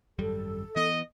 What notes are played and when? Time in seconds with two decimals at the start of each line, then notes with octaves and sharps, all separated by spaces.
0.19 G#1 F#2 G3 A4
0.76 E3 B3 D#5